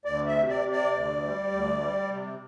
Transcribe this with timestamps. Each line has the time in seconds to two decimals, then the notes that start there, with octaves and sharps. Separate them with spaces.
0.05 D2 D5
0.27 E5
0.35 C3
0.49 D5
0.64 C3
0.72 D5
0.94 D2
1.23 G3
1.51 D2
1.80 G3
2.10 C3